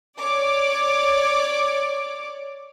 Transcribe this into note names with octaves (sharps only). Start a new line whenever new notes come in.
C#5 D5 D6